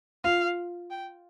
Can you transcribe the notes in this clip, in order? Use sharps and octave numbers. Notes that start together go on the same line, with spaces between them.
F4 F5
G5